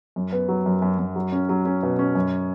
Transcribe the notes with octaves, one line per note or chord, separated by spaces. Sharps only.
F#2
B3
F#3
F#2
F#2
F#2
F#3
C#4
F#3
C#4
B2
C#4
F#2